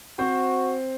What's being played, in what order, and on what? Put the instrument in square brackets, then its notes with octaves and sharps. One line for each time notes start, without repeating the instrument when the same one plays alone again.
[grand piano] C4 C5 [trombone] F#4